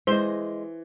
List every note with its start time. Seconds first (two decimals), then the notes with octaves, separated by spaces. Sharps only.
0.07 E3 G#3 C5 D#5 G7